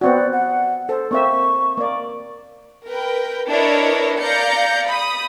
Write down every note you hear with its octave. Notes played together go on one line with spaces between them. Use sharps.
B3 C4 F#4 D5
F#5
A4 C5
A#3 C4 E5 C#6
A#3 D5
A#4 B4 G5
D4 E4 A#4 B4 C#5 D#5
D5 F5 A#5 G6 C#7
B5 D#6